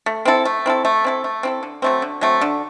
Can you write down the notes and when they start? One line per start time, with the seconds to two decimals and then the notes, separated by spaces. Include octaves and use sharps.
0.06 A3
0.25 C4 E4 A4
0.45 A3
0.66 C4 E4 A4
0.85 A3
1.04 C4 E4 A4
1.24 A3
1.43 C4 E4 A4
1.63 D3
1.82 F#3 A3 C4
2.02 D3
2.21 F#3 A3 C4
2.41 D3